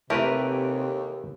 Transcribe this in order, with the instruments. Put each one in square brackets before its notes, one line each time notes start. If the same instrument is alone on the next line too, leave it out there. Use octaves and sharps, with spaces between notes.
[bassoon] D#2 [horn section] C3 [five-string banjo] E3 A3 [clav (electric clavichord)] G4 A#4 B4